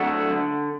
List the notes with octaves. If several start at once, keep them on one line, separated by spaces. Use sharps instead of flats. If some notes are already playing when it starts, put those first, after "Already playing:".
Already playing: F#3 A3 D4 F#4
D3